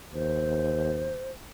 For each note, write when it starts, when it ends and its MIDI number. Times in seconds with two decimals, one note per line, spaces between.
0.14 1.17 39
0.14 1.32 72